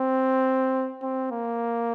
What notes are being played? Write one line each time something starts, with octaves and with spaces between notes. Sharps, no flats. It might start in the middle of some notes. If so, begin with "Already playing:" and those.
Already playing: C4
C4
A#3